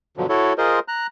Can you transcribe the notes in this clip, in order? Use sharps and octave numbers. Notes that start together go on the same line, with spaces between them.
G2 B2 D3 F3 F#3
E4 F#4 A4 C#5
F4 G#4 A#4 C5 D#5
A#5 F#6